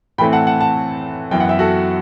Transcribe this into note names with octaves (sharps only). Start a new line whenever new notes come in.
A2 E3 A3 C4 G5 B5
F#5 A5
F#5 A5
F#5 A5
F#2 E3 B3 G5
F#5
E5 G5
F#4 A4